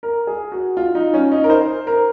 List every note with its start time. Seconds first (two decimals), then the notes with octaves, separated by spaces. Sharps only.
0.03 A#4
0.27 G#4
0.52 F#4
0.77 F4
0.95 D#4
1.14 C#4
1.32 D#4
1.44 A#4
1.50 C5
1.87 A#4